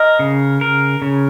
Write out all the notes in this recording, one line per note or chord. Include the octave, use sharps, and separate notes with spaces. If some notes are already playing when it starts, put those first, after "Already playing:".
Already playing: A#4 D#5
C#3
A#4
C#3